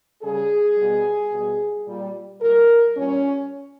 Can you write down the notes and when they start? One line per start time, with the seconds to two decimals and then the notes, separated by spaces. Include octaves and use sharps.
0.22 C#3 G3 G#4
0.77 B2 G3
1.32 B2 G3
1.87 A#2 G3
2.42 A#2 G3 A#4
2.97 A#2 G3 C#4